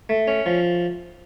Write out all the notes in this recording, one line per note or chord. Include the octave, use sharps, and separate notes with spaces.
A3
C#4
F3